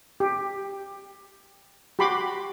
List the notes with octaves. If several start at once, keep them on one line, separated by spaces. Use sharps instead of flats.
G4
F#4 G4 B5 C6 D6